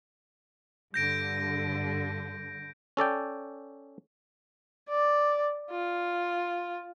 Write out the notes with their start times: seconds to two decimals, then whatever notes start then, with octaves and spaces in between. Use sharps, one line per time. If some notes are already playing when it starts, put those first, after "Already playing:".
0.94 G2 D3 G6 A#6 D7
2.97 C#4 A4 D5 G5
4.89 D5
5.71 F4